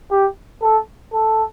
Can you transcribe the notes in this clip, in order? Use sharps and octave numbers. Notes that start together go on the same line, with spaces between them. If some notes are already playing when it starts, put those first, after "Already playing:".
G4
A4
A4